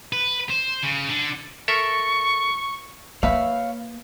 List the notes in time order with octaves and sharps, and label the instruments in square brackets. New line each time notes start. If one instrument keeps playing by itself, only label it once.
[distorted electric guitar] B4
C5
C#3
D3
[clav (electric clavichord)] A4 A#4 E5 [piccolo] C#6
[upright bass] A#3 [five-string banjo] B4 E5 [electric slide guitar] C#5 F5